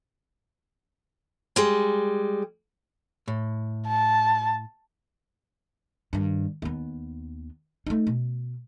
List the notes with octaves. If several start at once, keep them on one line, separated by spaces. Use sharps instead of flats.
G3 G#3
A2
A5
G2 D#3
D#2 B3
A3 D#4
B2